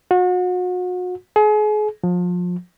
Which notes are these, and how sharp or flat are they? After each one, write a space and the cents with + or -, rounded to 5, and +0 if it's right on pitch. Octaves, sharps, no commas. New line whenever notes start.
F#4 -35
G#4 +35
F3 +30